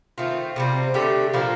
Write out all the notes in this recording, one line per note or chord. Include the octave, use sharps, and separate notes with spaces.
D#3 A3 C4 F4
C3 D#3 G3 C4
D3 A3 D4 G4
A#2 F3 A#3 D4